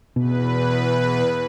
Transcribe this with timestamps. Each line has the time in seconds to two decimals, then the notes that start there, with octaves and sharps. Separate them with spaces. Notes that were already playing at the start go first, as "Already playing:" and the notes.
0.16 E2 B2 B4